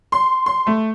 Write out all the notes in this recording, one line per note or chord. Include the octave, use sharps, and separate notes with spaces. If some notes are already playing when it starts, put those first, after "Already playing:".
C6
C6
A3